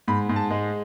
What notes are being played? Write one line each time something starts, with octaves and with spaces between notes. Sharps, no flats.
G#2 B5
G#2
A5
G#3